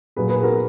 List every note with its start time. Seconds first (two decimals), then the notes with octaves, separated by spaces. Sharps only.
0.16 A#2 F#3 A#3 G#4 B4
0.29 G#4 B4
0.43 F#4 A#4